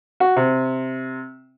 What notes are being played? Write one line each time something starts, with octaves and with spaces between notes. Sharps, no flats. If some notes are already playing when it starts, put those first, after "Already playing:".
F#4
C3